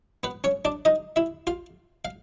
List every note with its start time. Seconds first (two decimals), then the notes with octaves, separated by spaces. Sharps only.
0.23 B3 B4
0.44 C#4 C#5
0.65 D4 D5
0.85 D#4 D#5
1.16 E4 E5
1.47 F4 F5
2.05 F5